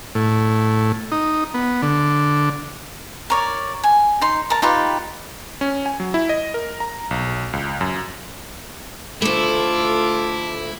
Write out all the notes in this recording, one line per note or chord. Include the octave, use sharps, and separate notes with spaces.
A2
D#4
B3
D3
A#4 C#5 D5
G#5
D#4 C6
A#4 A5
D#4 F4 G4 B4
C#4
G#5
F#3
E4
D#5
A#4
A#5
B1
C#2
F#2
D2 A3 E4 F4 A4 D6